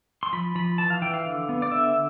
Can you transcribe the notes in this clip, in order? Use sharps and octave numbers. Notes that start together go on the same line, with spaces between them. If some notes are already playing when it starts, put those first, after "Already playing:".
C6
F3 B5
F3 B5
E3 A5
F5
E3 G5
F5
D3
B3
D5
D3 E5